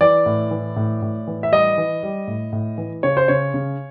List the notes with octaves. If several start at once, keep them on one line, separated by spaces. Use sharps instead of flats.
E3 D5
A2
E3
A2
A2
E3
E5
G3 D#5
E3
G3
A2
A2
E3
C#3 C#5
C5
C#3 C#5
C#3